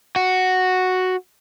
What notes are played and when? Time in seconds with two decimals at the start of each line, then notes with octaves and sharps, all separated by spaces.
0.16 F#4